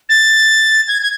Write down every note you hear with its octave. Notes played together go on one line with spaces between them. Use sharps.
A6
G#6
G#6